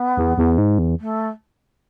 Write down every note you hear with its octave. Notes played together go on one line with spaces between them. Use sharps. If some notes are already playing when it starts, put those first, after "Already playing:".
Already playing: B3
E2
E2
G#2
E2
A3